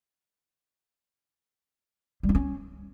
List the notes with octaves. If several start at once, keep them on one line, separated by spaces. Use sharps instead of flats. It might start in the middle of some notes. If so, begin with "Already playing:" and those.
G3
D4
C#4